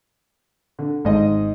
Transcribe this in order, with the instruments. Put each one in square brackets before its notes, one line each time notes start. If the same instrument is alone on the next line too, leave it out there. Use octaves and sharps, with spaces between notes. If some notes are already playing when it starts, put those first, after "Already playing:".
[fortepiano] D3
[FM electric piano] G#1 [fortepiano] G#2 D#5